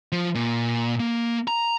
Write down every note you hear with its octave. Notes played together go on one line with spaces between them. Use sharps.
F3
A#2
A#3
A#5